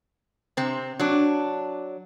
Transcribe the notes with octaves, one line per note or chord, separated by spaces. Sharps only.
C3 C4
F#3 D4